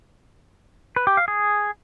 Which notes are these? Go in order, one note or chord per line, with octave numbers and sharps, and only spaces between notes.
B4
G4
F5
G#4